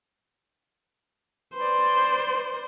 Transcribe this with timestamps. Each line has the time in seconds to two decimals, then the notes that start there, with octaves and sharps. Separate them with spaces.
1.56 B4 C5 D5